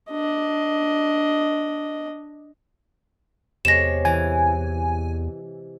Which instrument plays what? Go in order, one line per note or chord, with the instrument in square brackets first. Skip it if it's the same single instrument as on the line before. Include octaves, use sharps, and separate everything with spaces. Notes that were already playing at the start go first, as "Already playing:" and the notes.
[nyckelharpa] D4 D#5
[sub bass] E2 [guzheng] C3 G#3 C#5 [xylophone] A#6 E7
[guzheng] E3 [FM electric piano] G#5